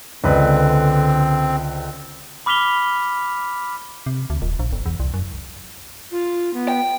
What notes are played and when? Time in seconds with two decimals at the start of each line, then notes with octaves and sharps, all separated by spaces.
0.24 C#2 D3 C4 B4 D5
2.46 B5 D6 F6 B6 F7 G7
4.06 C3
4.30 D2
4.42 D#1
4.59 A#1
4.73 G1
4.86 E2
5.00 C2
5.14 F#2
6.11 F4
6.54 B3
6.68 G5